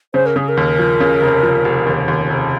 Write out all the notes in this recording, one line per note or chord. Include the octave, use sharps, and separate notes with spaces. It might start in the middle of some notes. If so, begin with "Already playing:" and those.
C#3 C5
A#4
C#3 G#4
A#4
D#2
F3
C#3
F1
F3
F1
D#2
D#2
F1